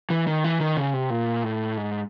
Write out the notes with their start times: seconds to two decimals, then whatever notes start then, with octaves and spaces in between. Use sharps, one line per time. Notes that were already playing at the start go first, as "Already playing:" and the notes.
0.10 E3
0.27 D#3
0.44 E3
0.60 D#3
0.77 C#3
0.94 C3
1.10 A#2
1.44 A2
1.77 G#2